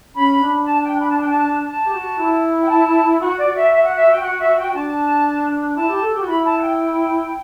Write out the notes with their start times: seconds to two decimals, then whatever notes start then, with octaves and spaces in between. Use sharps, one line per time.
0.15 C#4 B5
0.41 D4
0.65 A5
0.83 G5
1.00 B5
1.09 A5
1.20 G5
1.30 A5
1.67 A5
1.86 G4
1.94 F#4
2.18 E4
2.63 G5
2.69 A5
3.20 F#4 F#5
3.38 D5
3.46 F#4
3.56 E5
3.71 E5
3.83 F#5
3.95 E5
4.12 G5
4.23 F#5
4.39 E5
4.57 G5
4.74 D4 A5
5.75 E4 A5
5.89 G4
6.02 A4
6.14 G4
6.21 F#4
6.28 E4 B5
6.44 A5
6.57 F#5
6.61 G5